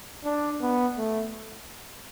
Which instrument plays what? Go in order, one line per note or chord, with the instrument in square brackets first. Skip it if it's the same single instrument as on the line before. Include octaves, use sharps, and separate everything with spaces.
[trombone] D4
B3
A3